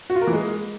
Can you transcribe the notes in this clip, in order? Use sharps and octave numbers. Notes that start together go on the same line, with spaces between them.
F#4
F4
A#4
E3
G#3